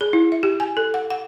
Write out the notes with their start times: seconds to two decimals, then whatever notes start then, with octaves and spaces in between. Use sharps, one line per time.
0.01 G#4
0.13 E4
0.32 E5
0.43 G4
0.60 G#5
0.77 A4
0.94 F#5
1.10 F#5